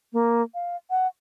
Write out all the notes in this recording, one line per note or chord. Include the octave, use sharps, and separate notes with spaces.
A#3
F5
F#5